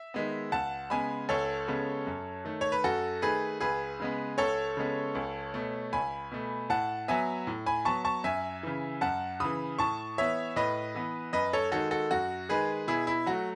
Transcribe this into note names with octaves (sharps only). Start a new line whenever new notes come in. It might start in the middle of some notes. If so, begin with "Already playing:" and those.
Already playing: E5
D#3 G#3 B3
C#2 F#5 A5
C#3 G#3 B3 G#5 B5
C#2 A4 C#5
C#3 G#3 B3
F#2
D#3 A3
C#5
B4
F#2 F#4 A4
D#3 A3 G#4 B4
C#2 G#4 B4
C#3 G#3 B3
C#2 A4 C#5
C#3 G#3 B3
C#2
B2 A3
C#2 G#5 B5
B2 A3
A2 F#5 A5
F#3 B3 E5 G#5
A2
G#5 B5
F#3 B3 A5 C#6
A5 C#6
F#2 E5 G#5
C#3 E3
F#2 F#5 A5
C#3 E3 B5 D#6
A2 A5 C#6
E3 B3 C#5 E5
A2 B4 D#5
E3 B3
F#2 B4 D#5
A4 C#5
D#3 G#3 F#4 A4
F#4 A4
F#2 F#4
D#3 G#3 G#4 B4
B2 E4 G#4
E4
F#3 A3 F#4